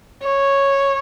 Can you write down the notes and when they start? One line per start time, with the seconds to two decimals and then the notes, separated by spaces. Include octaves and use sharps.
0.24 C#5